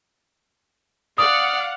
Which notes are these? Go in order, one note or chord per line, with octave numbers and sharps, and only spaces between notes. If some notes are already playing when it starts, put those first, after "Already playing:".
D5 F5 F#5 D#6